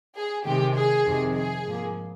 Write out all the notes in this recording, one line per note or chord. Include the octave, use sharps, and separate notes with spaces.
G#4
C3 D#3 G#3 G4
G#4
F2 C3 D#3
G#4
G#2 F3 A#3